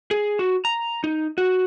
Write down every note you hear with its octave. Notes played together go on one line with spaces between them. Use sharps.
G#4
F#4
A#5
D#4
F#4